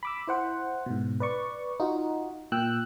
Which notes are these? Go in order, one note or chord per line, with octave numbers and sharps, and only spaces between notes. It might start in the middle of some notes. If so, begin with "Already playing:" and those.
B5 D6 E6
E4 C5 F#5
G#2 B2
B4 D5 C#6
D#4 F4 F#4
A#2 G5 E6 F#6